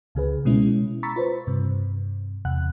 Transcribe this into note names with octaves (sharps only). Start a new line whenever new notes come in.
C#2 C#3 G#4 B4
B2 G#3 C#4 E4
A#5 B5 C#6 E6 A6 B6
F4 B4 C5
G2 C3
E2 C3 F#5 F#6